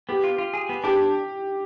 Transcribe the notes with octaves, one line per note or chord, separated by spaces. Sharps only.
B3 G4
F4
F4
G#4
B3
D4 G4